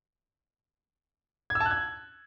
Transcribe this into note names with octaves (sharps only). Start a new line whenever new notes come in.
G#6
E6
A5
F#6
G#6